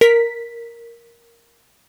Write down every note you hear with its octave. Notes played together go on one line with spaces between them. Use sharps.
A#4 B6